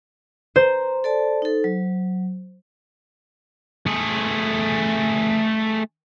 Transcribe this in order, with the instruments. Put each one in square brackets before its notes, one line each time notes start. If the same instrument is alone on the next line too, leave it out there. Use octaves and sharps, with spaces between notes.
[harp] C5 [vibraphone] A#5
[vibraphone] A4 D5 A5
D#4 A4
F#3
[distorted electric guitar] A3 G#4